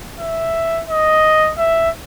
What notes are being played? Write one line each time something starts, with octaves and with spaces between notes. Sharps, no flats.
E5
D#5
E5